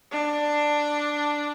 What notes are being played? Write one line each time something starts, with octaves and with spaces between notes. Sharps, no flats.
D4